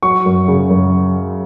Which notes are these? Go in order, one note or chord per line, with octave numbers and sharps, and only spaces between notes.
F#3 C#6
F#2
C#3
F#2